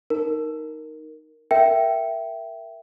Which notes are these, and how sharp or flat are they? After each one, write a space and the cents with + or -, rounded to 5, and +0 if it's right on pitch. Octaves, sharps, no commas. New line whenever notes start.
D#4 +0 A#4 +0
A#4 +0 E5 +10 G5 -15